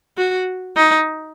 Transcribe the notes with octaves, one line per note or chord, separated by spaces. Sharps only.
F#4
D#4